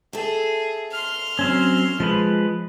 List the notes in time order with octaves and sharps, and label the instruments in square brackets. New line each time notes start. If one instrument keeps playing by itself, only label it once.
[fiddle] G#4 [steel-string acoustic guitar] A4 E5
[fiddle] C6 F6
[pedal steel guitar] F#3 C4 C#4
F3 G#3 B4